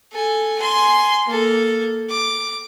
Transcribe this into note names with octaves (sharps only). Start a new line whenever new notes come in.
A4 G#5
G#5 C6
A#3 A4
D6